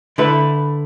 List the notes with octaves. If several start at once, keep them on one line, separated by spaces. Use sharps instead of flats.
D3 A3 E4 B4